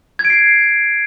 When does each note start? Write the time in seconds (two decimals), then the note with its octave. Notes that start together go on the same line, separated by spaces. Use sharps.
0.19 G#6
0.25 D7
0.30 C7